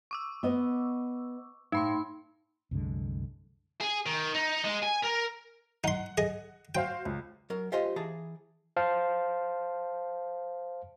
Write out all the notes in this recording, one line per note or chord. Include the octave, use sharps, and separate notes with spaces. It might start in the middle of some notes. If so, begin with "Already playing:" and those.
C#6 D6 E6
B3 D#5
A2 D#4 B5 C6
C2 F#2 D3 G#3
G#4
D#3
D#4
G#3
G#5
A#4
D#4 F#5 C6
G#4 D#5
F#4 C5 F5 G5
C#2
F#3 A#4
F4 G4 C5 D#5 F5
E3 G#4 A5 A#5
C5 F5 A5